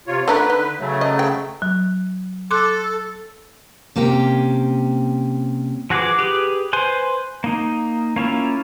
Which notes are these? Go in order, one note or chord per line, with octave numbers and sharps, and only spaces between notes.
C3 F4 C#5
D3 A3 D4 A#4 B4
D#4
C#3 F#3 A3
D#5
G5
F#3
A4 C6 D6 F#6
C3 A#3 C#4 G4
F3 F#4 G#4 B4 D6
G4 G#4 B4
B4 C5 G#5 C6
A#3 D#4
A#3 C#4 E4 F4